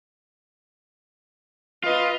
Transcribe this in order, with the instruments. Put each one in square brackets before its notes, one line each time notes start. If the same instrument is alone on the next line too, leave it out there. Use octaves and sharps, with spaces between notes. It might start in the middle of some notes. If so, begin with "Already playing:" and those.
[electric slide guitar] F4 [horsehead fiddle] B4 D#5